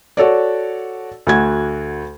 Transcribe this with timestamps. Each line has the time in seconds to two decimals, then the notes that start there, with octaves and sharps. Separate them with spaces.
0.17 F#4 A4 C#5 D5
1.27 D2 F#4 G#6